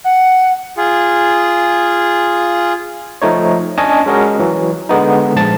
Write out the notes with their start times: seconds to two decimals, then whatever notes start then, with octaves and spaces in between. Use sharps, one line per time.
0.04 F#5
0.77 F4 G#4
3.22 F3 A3 D#4 C#5
3.78 C#4 D4 C#5 D#5 G#5 A5
4.06 G#3 C#4 F#4 A#4 D#5
4.39 E3 F#3
4.89 D3 G#3 B3 D#4
5.36 A#1 G#2 A5 A6